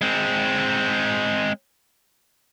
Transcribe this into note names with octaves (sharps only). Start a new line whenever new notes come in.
G#3 C4